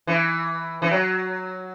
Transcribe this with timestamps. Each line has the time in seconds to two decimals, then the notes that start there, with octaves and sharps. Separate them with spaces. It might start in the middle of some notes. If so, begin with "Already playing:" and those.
0.07 E3
0.82 E3
0.91 F#3